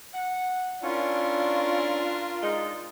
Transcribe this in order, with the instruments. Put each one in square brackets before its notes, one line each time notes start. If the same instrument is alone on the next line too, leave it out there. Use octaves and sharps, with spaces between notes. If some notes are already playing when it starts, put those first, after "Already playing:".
[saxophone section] F#5
[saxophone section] C#4 E4 [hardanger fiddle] D4 A#4 [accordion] F4
[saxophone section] G#3 D#4